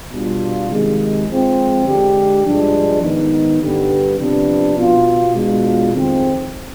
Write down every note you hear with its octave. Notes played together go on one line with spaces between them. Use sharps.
B2 G3 D4 F4
C3 D#3 G#3
F3 G#3 C4
D3 G#3 D4 G4
G2 F3 G#3 D4
G#2 D#3 B3 D#4
G2 D3 G3 B3
C3 F3 B3 D4
B2 B3 F4
B2 G#3 D4 F4
F2 D#3 G#3 C4